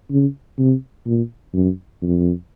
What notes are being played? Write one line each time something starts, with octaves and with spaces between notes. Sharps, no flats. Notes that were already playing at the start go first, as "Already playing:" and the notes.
C#3
C3
A#2
F#2
F2